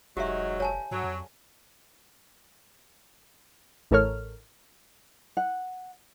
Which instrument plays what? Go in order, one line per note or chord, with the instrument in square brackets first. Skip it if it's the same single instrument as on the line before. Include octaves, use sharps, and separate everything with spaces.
[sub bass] F1 [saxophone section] G#2 F#3 [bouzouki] G#3 A3 D#4 [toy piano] G4 E5
[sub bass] F1 [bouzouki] D3 E3 [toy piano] C#5 G#5 A5
[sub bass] G2 [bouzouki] D3 C#4 A#4 [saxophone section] F#3
[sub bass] F2
[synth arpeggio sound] A1 A2 A4 A#4 C#5 F6
[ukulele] F#5